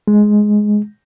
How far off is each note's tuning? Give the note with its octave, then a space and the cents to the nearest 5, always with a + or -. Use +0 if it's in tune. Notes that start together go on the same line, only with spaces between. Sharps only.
G#3 +5